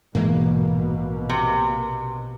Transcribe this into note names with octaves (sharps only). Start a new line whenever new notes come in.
A#1 G#2 B2 E3 G#3 A#3
C3